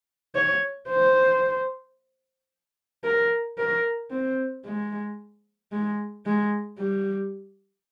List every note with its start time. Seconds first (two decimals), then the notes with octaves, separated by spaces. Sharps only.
0.35 C#5
0.89 C5
3.04 A#4
3.58 A#4
4.11 C4
4.65 G#3
5.72 G#3
6.26 G#3
6.79 G3